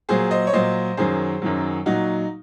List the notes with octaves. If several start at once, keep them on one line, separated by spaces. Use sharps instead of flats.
A#2 F#3 G#4 C5
C5 D#5
C#5
A#2 F#3 C5 D#5
F#2 D#3 F#3 G#4 C5
F#2 D#3 F#3
A#2 F#3 D#4 F#4